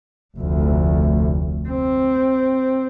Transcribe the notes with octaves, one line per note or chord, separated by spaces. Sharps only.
F1 D2
C4